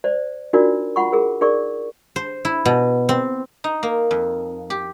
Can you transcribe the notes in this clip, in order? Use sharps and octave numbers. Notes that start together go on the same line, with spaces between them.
C5 D5
D4 D#4 F4 F#4 A#4 D5
F4 F#5 B5 C#6
G#4 A#4
D#4 G#4 A#4 D5 C#6
C5
E4
B2
C4
D#4
A#3
F2
G4